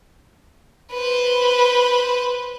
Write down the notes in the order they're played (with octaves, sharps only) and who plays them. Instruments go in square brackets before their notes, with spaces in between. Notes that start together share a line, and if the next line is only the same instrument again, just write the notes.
[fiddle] B4 C5